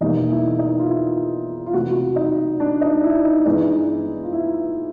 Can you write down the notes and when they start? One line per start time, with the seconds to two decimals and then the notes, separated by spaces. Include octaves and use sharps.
0.01 E2 B2 G3 A#3 D#4
0.30 E4
0.59 D#4
0.79 F4
0.88 E4
1.66 F4
1.73 C3 E3 A3 F#4
1.95 F#4
2.16 D#4
2.60 D4
2.81 D#4
3.03 E4
3.25 D#4
3.45 G2 E3 G#3 B3 D#4
4.23 F4
4.32 E4